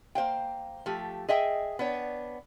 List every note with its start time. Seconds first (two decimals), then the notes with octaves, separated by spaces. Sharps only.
0.15 A#3 C5 F5 G5
0.86 F3 A3 G4
1.28 G#4 D#5 E5 G5
1.79 B3 D4 C#5